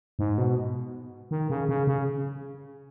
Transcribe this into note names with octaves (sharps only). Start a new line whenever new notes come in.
G#2
B2
D#3
C#3
C#3
C#3